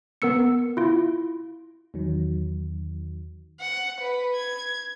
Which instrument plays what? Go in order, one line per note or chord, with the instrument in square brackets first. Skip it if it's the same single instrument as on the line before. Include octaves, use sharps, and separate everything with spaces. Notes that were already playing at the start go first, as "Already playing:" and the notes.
[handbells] B3 A#4 E6 C#7
E4 F4
[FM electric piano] E2 D#3 F#3
[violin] F#5
B4
G#6